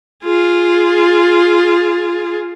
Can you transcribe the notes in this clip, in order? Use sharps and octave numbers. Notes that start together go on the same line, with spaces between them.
F4 G#4